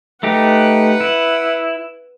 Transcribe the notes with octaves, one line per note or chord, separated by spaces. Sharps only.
A3 D#4 G4 B4 F#5
E4